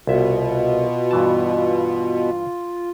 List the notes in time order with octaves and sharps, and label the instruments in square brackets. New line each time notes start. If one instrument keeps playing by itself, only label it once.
[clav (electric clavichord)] C2 E5 [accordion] B2 [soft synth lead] F4
[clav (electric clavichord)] G2 E3 A5